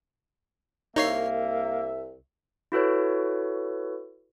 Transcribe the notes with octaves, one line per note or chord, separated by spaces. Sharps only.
C2 A#3 D#4 C#5 E5 C7
E4 F#4 A4 B4 C#5